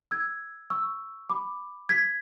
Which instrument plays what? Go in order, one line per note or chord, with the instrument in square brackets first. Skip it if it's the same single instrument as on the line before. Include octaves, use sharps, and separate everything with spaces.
[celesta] E6 G#6
C#6 E6
B5 D6
G#6 B6